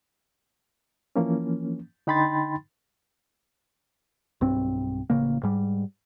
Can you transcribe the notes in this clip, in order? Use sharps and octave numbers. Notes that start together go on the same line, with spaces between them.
E3 F3 A#3 C#4
D3 D#4 G5 B5 C6 A6
B1 G2 C4
A1 C#3 A#3
G#2 G3